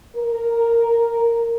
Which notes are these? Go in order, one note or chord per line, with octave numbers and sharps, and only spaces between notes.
A#4